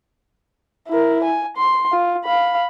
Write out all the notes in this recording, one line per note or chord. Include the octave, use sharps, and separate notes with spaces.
E4 A#4
G#5
C6
F4
F5 B5